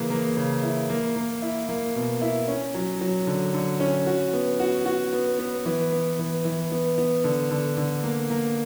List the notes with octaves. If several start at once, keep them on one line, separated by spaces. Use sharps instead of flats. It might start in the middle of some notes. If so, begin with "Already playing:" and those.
Already playing: C#3 E3 A#3
A#3
C#3
E4
A#3
A#3
E4
A#3
B2
E4
C#4
F#3
F#3
D3
D3
C#4
F#4
B3
F#4
F#4
B3
B3
E3
B3
E3
E3
B3
B3
D3
D3
D3
A#3
A#3